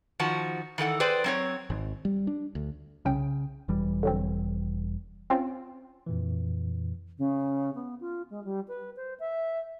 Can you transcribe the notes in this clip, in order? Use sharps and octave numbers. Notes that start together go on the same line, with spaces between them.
D#3 F3 F#4 A5
D#3 E3 A4 F#5
G#4 B4 C5 D5 G5
F#3 C4 C#5
G#1
G3
D4
D2
C2 C#3 C#4 G5
E1 E3 G3
D3 F#3 C4
C4 C#4 F4
F2 A#2 E3
C#3
B3
F4
G#3
G3
B4
C5
E5